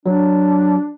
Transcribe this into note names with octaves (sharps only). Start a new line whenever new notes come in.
F#3 D4